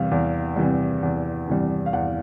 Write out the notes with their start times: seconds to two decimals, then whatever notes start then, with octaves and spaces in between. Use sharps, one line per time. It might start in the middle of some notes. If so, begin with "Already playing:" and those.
Already playing: E2 C3 E3 G3 F5
0.11 E2
0.56 C3 E3 G3
1.03 E2
1.48 C3 E3 G3
1.86 F5
1.93 E2 F#5